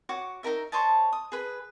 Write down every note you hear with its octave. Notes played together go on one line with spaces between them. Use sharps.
F#4 C#5 D6
D#4 F#4 A#4 E5
C5 C#5 D#5 A5
D#6
G#4 B4